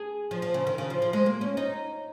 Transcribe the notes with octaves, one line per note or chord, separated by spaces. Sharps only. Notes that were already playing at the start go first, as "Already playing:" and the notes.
Already playing: G#4
F3
F3
C#3
D#3
C#3
F3
F3
G#3
A#3
C#4
D#4